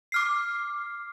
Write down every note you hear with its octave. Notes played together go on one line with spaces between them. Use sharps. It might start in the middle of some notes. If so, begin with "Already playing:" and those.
D6 F6 C7